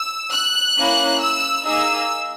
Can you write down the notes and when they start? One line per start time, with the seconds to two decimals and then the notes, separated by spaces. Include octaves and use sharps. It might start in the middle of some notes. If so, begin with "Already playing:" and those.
Already playing: E6
0.31 F#6
0.76 A#3 C#4 E4
1.21 E6
1.66 A#3 D#4 G#4 E6